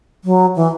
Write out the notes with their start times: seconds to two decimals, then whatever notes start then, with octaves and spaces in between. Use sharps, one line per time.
0.24 F#3
0.56 E3